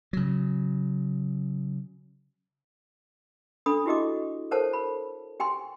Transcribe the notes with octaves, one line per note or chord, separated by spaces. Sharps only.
C#3 F#3
D4 A4 B5 D#6
E4 F#4 G4 D#5 D6
A4 A#4 C5 C#5 F#5 A5
B5
G4 G5 G#5 C6